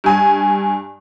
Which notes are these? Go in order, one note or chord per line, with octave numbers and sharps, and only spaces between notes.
G2 G#5